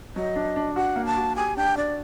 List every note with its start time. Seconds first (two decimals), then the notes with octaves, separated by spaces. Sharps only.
0.16 F#3 D#5
0.36 D4
0.56 D4
0.76 F#4 F#5
0.96 A#3
1.06 A5
1.17 F#4
1.36 G4 G#5
1.57 D4 G5
1.77 D4 D5